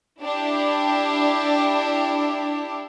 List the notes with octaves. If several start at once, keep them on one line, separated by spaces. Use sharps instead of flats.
D4 E4 G4